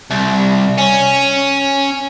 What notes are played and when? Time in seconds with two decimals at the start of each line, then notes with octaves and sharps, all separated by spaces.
0.10 C2
0.78 C#4